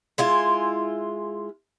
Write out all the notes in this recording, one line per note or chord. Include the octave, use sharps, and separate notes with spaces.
G#3 E4 F4 G#5